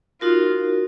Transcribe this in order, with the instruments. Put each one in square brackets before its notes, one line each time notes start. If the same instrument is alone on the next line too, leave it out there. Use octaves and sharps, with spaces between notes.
[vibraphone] D#4 F#4 A#4 [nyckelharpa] F4